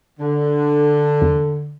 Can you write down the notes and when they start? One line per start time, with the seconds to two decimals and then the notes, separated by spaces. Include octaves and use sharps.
0.20 D3
1.22 E2